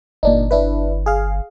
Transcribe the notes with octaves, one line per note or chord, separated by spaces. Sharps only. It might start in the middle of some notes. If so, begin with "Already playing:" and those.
G1 A#2 D4 D#4
D4 E4 B4
G#4 F5